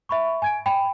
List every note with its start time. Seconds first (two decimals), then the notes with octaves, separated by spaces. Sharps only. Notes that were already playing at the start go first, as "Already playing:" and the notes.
0.09 E5 B5 C#6
0.42 G#5 G#6 D7
0.66 G5 B5